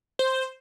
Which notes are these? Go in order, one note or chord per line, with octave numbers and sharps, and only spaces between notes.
C5